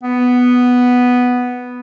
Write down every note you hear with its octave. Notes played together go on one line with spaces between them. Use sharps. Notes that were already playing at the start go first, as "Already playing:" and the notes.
B3